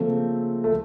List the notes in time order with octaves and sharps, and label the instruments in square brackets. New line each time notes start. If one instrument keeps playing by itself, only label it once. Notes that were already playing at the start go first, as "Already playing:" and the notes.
Already playing: [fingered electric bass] C#3 F3 A#3 [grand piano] A3 C4
[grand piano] A3